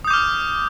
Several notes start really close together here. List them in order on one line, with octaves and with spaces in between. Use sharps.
D#6 G6 D6 F6